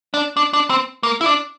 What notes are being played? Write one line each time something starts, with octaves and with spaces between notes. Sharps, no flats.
D4
D4
D4
C4
A#3
E4
D4